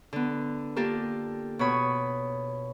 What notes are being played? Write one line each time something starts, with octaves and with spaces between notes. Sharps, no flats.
D3 B3
A#3 D4 F4 G4 A4 A#4
B2 C#5 B5 D#6